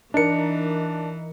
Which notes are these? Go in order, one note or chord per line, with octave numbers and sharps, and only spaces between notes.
E3 D4 D#4 A#4 C#7